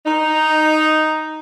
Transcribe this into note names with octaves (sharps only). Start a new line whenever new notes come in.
D#4